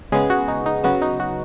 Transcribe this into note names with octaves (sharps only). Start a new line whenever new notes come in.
C#3 G#3 B3 G#4
F#4
D#4
D#4
C#3 F#3 B3 F#4
D#4
F#4